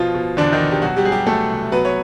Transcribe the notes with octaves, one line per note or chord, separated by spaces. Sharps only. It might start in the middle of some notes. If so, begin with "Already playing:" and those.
Already playing: B2 F3 F4
B2
E2 D3 D4
D#3 D#4
B2
G4
B2 F#3 F#4
G3 G4
F#3 G#4
G3 G4
F#3 A3 A4
C2
F#3 B3 B4
C#5